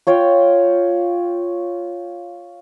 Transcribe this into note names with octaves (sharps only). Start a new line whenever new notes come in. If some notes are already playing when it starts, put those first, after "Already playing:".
F4 C#5 F5 G5